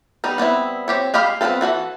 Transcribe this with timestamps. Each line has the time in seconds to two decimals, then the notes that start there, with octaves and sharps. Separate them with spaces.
0.24 G3 B3 D#4
0.38 G3 B3 C4 E4
0.88 C4 G4 C#5
1.14 G#3 G4 D#5 F5 B5
1.41 B3 C4 E4 F4 A4
1.61 E3 C4 F#4 A4